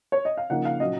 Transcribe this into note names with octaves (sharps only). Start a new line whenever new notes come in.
C#5
D#5
F5
C#3 F3 A#3 D#4 F#5
F5
A#2 F#3 C#4 D#5